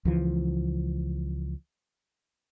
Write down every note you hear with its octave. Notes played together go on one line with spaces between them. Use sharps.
C#2 E3 F3